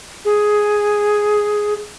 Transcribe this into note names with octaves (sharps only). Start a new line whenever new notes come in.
G#4